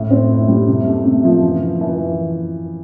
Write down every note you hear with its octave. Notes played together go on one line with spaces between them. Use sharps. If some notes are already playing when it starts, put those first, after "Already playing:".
Already playing: A2
C4
E4
G3
C3
A3
C3
F3
E3
E4
E3